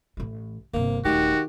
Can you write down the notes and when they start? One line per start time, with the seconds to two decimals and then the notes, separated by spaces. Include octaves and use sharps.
0.17 A1 E3
0.73 G1 C3 A#3
1.05 D#1 D#3 A3 F#4 G4